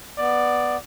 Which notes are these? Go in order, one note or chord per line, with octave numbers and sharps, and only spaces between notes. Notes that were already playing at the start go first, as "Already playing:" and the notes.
B3 D5